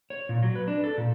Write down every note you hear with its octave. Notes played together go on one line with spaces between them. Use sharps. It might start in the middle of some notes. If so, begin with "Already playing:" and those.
C#5
A#2
F#3
B4
D4
A4
A#2